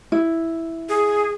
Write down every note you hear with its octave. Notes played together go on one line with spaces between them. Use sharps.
E4
G#4